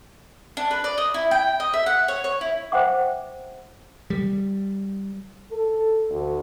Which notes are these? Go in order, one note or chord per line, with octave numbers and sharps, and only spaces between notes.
D4
B4
D5
D#5
E4
G5
D#5
E5
F#5
C#5
C#5
E4
C5 E5 F#5 G5 D6
G3
A4
D2